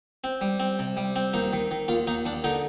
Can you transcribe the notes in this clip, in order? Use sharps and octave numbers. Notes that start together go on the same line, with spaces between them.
C4
G3
C4
C3
G3
C4
D#2 D#4
D#3
D#3
D#2 F4
D#2 D#4
D#2 D4
D3 D#4